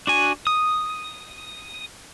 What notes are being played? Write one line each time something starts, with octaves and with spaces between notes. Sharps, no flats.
D4 F#4 G#5
D#6